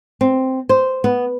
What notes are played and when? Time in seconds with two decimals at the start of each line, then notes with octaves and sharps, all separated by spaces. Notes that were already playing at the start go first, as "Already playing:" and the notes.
0.21 C4
0.69 C5
1.04 B3